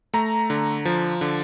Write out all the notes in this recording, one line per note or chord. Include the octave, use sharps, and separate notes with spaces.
A3 A#5
D3
F3
D3